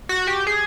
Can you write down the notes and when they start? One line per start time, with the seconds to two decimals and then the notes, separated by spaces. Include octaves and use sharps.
0.09 F#4
0.27 G4
0.47 G#4